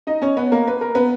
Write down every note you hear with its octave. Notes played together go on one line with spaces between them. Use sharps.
D#4 D#5
C#4 C#5
B3 B4
A#3 A#4
B4
A#4
B3 B4